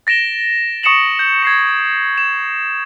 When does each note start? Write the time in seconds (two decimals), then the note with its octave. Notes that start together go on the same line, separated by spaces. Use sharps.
0.07 A6 A#6 D7 E7 G7
0.83 C#6 D#6 C#7 D7 E7 F#7
1.19 G6
1.43 G#6 C7 C#7
2.18 E7